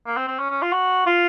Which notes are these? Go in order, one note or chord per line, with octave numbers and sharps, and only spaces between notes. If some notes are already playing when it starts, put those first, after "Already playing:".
A#3
C4
C4
C#4
C#4
F4
F#4
F4